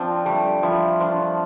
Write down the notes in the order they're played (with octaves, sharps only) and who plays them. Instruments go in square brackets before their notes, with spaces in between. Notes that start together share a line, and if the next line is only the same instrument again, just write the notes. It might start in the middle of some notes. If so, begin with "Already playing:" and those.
Already playing: [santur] F3 [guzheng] C4 D4
[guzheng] G3 [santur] A3
[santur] F3 [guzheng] E4
[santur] F3 [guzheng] D4